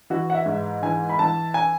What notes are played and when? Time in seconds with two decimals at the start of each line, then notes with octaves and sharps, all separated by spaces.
0.10 E3 F#4
0.30 F#5
0.34 E5
0.46 G#2
0.83 E3 G#5
1.09 B5
1.19 E3 A5
1.54 G#5